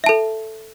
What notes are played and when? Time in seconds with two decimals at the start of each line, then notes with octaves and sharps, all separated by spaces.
0.04 E5
0.06 A5
0.09 A4